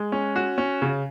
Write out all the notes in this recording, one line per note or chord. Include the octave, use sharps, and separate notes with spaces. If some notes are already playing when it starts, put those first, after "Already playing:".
Already playing: G#3
C#4
F#4
C#4
C#3